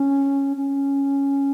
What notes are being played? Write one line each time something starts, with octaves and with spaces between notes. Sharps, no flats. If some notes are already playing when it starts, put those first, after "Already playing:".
Already playing: C#4
C#4